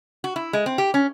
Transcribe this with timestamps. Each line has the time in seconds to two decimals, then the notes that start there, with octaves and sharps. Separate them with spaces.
0.24 F#4
0.36 E4
0.53 G#3
0.66 C4
0.78 G4
0.94 C#4